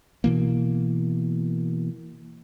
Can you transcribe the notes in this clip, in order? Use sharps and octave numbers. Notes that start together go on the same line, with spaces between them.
B2 E3 A#3